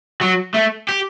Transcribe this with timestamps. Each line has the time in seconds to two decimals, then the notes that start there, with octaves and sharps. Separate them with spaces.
0.21 F#3
0.54 A3
0.89 G4